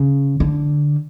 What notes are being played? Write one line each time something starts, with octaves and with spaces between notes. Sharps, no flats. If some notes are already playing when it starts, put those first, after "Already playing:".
Already playing: C#3
D3